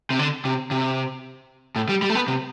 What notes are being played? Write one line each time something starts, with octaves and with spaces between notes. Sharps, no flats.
C3
D3
C3
C3
A2
G3
G3
A3
B3
C3